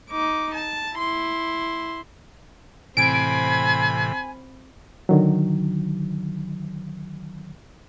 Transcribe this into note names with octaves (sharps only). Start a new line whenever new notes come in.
D#4 D6
A5
E4 C6
A2 C3 E3 C4 G#5 B5 D7
D3 D#3 F#3